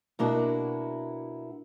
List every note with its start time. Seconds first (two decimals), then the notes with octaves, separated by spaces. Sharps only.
0.19 B2 A#3 D4 E4 F#4